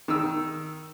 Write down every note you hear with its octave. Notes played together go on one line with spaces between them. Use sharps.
D#3 E6